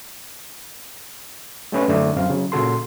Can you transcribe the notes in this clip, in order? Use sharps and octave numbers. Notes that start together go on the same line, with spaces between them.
G3 A3 C#4 B4
F#2 D3 A3 D4 D#4
F#2 C4 F5
C#3 F#3
A#2 C#3 F#4 A4 C6